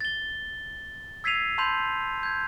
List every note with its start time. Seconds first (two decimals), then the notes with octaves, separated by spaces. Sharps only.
0.01 A6 G7
1.24 E6 G#6 B6 C7 D#7 F7
1.58 A5 B5 C6 G6 F7
2.23 G6 G#6